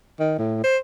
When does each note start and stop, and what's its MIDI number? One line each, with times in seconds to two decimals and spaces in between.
0.19 0.34 51
0.38 0.61 45
0.64 0.78 72